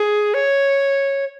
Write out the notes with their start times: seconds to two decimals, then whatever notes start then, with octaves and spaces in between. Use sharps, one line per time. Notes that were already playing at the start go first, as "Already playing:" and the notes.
Already playing: G#4
0.34 C#5